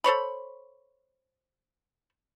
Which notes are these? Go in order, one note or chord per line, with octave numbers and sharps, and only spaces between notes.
A4 C5 C#5 B5